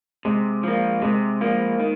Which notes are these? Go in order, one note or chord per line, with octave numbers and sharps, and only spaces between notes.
C3 G#3
F3 A#3
C3 G#3
F3 A#3
D#3